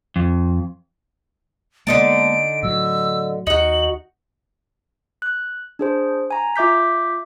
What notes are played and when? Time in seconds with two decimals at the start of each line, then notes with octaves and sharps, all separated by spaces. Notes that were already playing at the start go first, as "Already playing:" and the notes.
0.16 F2
1.87 D3 G#3 A#3 B3 D#4 A5 D7
2.63 A2 F#3 E6
3.47 D#2 D#4 F#4 F#7
5.22 F#6
5.79 D4 G#4 C5
6.31 G#5 A#5
6.56 F4 E5 D6 G6 B6